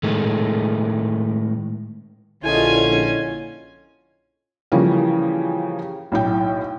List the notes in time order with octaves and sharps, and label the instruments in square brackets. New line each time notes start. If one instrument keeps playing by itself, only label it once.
[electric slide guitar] A2 D#3 G#3 A3
[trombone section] A#1 D3 [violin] C#4 [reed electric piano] E4 A4 D#5 [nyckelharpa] F4 G#5
[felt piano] C#3 E3 F3 G3 A#3 C#4
B1 A2 G5